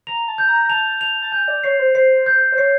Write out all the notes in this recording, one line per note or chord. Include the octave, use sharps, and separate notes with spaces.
A#5 F7
A5
G6
A#5
A#5
A5 F7
F7
A5
G#5 G6
D5
C#5 C7
C5
C5 C7
G6
C5
C#5 C7